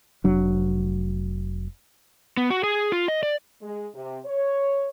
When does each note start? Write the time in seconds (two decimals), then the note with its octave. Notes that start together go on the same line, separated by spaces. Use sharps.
0.24 F1 F#3 D4
2.37 B3
2.50 F#4
2.64 G#4
2.92 F4
3.08 D#5
3.23 D5
3.61 G#3
3.94 C3
4.25 C#5